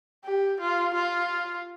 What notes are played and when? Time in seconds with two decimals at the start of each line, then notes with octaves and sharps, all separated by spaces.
0.25 G4
0.60 F4
0.94 F4